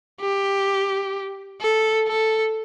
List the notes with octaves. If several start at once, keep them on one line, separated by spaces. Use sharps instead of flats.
G4
A4
A4